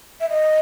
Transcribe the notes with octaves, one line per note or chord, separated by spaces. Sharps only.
E5
D#5